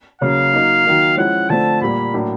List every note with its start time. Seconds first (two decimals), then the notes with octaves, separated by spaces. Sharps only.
0.21 C#3 F#3 A#3 C#4 F5
0.53 F#3 A#3 D#4
0.85 D#3 F#3 A#3 D#4
1.17 F3 G#3 C#4 E4 F#5
1.49 D3 F3 A3 C4 A5
1.82 A#2 G3 A#3 B5
2.14 A2 F#3 A#3 D4